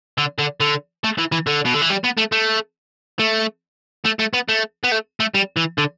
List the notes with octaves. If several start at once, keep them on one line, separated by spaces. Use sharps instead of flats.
D3
D3
D3
A3
E3
E3
D3
B2
D3
E3
G3
B3
A3
A3
A3
A3
A3
B3
A3
B3
A3
A3
G3
E3
D3